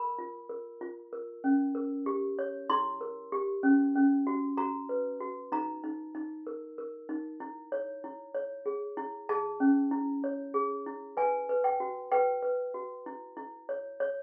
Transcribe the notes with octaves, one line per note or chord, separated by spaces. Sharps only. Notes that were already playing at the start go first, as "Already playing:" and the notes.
Already playing: A#4 B5
F4
A#4
F4
A#4
C#4
A#4
G4
C#5
E4 C6
A#4
G4
C#4
C#4
F#4
F#4 A#5
B4
F#4
D#4 A#5
D#4
D#4
A#4
A#4
D#4
E4
C#5
E4
C#5
G#4
E4
G#4 A5
C#4
E4
C#5
G#4
E4
B4 G#5
B4
G5
F#4
B4 G5
B4
F#4
E4
E4
C#5
C#5